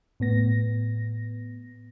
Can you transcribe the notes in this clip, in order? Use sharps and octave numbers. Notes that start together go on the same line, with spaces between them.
A2 B3 A#6